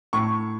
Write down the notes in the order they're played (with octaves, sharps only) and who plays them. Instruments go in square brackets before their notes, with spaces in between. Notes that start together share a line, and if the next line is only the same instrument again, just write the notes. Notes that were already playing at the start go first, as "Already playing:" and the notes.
[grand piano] A2 C#6